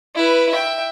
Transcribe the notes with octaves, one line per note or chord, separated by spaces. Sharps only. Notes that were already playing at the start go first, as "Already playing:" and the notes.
E4 B4
E5 G5